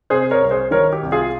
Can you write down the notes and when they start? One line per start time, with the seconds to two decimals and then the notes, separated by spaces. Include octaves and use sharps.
0.10 C3 G#4 C5
0.31 A#4 C#5
0.42 C2
0.51 G#4 C5
0.71 D#3 A#4 C#5
0.93 G4
1.03 C2
1.12 F4 G#4